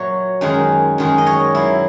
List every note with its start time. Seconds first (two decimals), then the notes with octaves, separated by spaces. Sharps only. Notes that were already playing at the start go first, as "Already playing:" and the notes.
Already playing: A#2 F#3 C#5 E5
0.41 F#2 D#3 G#3
0.98 F#2 D#3 G#3
1.18 D#5
1.27 C#5
1.55 A#2 F#3 E4